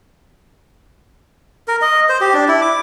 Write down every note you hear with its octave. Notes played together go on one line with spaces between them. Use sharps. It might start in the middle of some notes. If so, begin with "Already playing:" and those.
A#4
D#5
C5
G4
D4
E4
D6